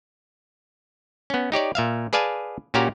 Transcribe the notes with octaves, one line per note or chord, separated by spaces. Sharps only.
B3 C#4
D#4 G4 C#5 D5
A#2 E5 F5
G#4 B4 D5 F5 G#5 A5
A#2 C#4 F#4 G4 F5 A#5